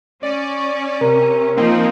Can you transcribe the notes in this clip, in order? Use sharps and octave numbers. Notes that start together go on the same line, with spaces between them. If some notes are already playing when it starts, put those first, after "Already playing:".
C#4 D5
C3 A#4 A#5
F3 A#3 C4 D#4